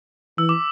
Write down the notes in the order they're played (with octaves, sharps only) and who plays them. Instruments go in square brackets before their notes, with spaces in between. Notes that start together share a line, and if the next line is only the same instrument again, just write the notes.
[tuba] E3 [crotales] E6
[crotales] D6